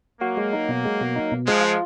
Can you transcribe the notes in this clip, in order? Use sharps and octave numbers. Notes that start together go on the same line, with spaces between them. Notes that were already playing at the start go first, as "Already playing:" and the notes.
F#3 A#3 F#4
G#3
D#4
B2
G#3
B2
D#4
B2
F3 G#3 F4
F4